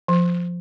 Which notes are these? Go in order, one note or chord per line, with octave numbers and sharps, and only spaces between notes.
F3